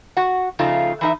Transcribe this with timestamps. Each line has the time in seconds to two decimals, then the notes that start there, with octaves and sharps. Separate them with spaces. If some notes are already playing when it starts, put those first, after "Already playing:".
0.17 F#4 F#5
0.59 C#3 F3 A3 D#4 F4
1.01 E3 D#4 E5